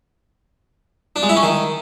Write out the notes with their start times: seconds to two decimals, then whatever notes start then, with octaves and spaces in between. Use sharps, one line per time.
1.16 D4
1.23 G#3
1.29 E4
1.36 C#4
1.43 D#3